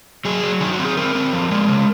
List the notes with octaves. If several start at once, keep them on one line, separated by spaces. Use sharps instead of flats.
F#3 G#4
F#3
D#3 G#4
F#4
C4
G#4
C4 A#4
C4
F3
G#3
C#3